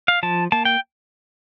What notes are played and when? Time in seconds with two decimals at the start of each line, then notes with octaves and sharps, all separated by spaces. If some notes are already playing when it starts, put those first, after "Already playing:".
0.08 F5
0.23 F3 A5
0.52 A#3 A5
0.65 G5